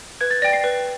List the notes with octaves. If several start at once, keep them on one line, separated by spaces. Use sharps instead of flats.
B4 G#6
A6
D5 G5 A#6
C7
B4